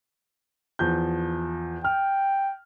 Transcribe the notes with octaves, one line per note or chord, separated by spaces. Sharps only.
E2 F3 G6
G5 F6